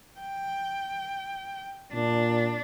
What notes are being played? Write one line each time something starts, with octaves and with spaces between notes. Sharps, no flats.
G5
A#2 D4